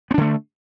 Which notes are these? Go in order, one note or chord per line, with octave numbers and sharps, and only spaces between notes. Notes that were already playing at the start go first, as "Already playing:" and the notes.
D3 A3 B3 D4